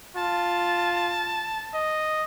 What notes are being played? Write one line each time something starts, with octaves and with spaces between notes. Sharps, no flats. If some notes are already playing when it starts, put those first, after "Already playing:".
F4 A5
D#5